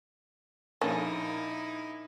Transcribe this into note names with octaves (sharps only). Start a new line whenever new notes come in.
A#1 A#3 C#4 D#4 E4 A5